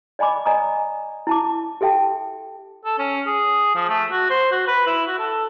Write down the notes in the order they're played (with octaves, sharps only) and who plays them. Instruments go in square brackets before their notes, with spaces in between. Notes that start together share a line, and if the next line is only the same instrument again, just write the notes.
[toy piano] D5 D#5 G#5 B5 D6
D5 D#5 G#5 A#5 D#6
E4 A5 D6
G4 A4 E5 G5 A5
[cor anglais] A4
C#4
G#4
F3
A3
F#4
C5
F#4
B4
E4
F#4
A4